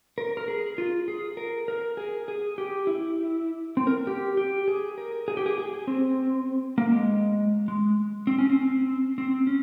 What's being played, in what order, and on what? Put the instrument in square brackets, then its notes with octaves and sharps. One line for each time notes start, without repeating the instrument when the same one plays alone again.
[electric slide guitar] A#4
A#4
G#4
F4
G#4
A#4
A#4
G#4
G#4
G4
E4
C4
A#4
G4
G4
G#4
A#4
G#4
G4
G#4
G#4
C4
A#3
G#3
G#3
C4
C#4
C4
C4
C#4